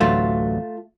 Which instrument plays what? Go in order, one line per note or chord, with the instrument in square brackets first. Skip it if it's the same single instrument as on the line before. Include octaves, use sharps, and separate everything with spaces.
[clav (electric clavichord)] A1 D2 F#3 [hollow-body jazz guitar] A3 F4